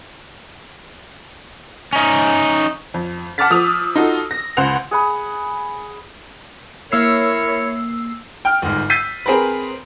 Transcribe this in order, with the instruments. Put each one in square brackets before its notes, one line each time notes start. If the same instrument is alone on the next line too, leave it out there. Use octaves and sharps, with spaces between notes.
[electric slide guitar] C#4 D#4
[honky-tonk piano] F2
F#5 A5 D6 F6 A6 B6
F3 D#6 E6 F7
D#4 F4 F#4 A4
A#6
C#2 C5 F#5 F#6 F7
[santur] G#4 F#5 B5
[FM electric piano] A#3 E6 C7 [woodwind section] E4 A#4 C#5
[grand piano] G5 F6
G1 G#2
E6 G6 A6 B6 C7 D#7
C4 G#4 A#4 B4